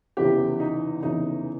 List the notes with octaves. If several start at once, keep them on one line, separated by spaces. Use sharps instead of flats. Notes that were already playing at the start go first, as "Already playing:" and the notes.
F1 E2 C#3 E3 G4
D#4
F1 E2 C#3 E3 D#4